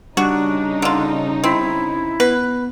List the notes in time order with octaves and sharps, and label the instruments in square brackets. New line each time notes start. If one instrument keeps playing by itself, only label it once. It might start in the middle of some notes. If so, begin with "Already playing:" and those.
[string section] C#3 D#4 [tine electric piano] G3 [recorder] D4 [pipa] F#4
[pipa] D3 F4
[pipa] C4 [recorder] E4
[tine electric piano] B3 [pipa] B4